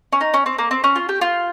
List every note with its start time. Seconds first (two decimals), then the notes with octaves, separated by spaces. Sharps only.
0.12 C#4
0.21 D#4
0.34 C#4
0.46 C4
0.58 A#3
0.71 C4
0.84 C#4
0.96 F4
1.09 G4
1.21 F4